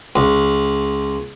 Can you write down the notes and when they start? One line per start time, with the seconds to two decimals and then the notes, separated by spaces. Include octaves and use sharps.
0.16 C#2